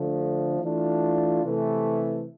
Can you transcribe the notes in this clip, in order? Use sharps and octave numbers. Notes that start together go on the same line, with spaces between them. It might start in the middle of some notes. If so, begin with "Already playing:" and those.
Already playing: D3 F3 A3
E3 A3 D4 F4
C3 E3 A3